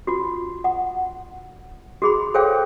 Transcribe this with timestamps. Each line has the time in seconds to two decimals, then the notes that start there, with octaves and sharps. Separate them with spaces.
0.07 F4 F#4
0.64 F#5
2.02 F#4 G#4 B5
2.34 G#4 A4 C5 C#5 F5 G5